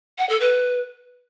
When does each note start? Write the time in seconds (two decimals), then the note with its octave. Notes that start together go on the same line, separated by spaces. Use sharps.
0.18 F#5
0.29 A4
0.40 B4